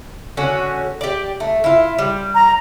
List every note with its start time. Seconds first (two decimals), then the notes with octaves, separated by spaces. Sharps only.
0.37 D3 C#4 F#4
1.01 G4 D5
1.40 A3
1.64 E4 F4
1.99 G3
2.35 A#5